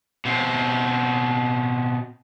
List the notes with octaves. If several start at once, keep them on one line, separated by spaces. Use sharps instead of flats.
B2 C4